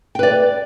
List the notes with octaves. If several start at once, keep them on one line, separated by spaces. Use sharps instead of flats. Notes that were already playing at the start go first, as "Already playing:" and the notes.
B4 D5 G5